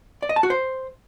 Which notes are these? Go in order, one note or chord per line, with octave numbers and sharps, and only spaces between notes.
D5
D#5
A5
F#4
C5